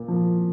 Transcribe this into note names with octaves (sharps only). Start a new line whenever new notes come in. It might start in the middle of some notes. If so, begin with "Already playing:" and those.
Already playing: A#2
F3 A#3